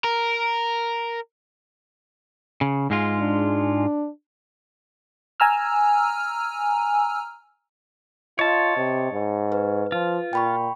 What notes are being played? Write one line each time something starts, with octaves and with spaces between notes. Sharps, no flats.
A#4
C#3
G#2 G#3 F4
D4
G#5 A#5 E6 F6
F4 C#5 D#5 A5
C3
G#2
B4
F3 F4
A#2 G5 B5 C#6